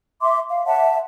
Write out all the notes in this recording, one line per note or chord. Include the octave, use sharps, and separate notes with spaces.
E5 C6 D6
F5
C#5 E5 F#5 A5